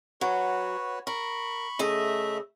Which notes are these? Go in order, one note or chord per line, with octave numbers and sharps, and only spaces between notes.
F#3 F#4 B4 C#5
A#4 B5 C#6
C#3 A3 D#5 E5